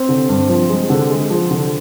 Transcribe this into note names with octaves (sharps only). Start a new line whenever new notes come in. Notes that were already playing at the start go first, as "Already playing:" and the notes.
Already playing: C4
D3
G2
F3
G#3
D3
G#3
F3
D3